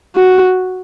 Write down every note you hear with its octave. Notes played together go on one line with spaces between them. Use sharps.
F#4